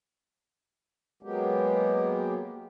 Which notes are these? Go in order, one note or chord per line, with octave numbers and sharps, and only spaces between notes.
F#3 G#3 A#3 B3 G4